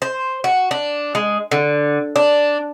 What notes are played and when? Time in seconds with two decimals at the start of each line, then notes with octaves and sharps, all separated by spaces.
0.02 C5
0.44 F#4
0.71 D4
1.15 G#3
1.51 D3
2.16 D4